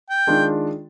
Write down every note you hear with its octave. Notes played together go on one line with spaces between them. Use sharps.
G5
D#3 G#3 D4 F4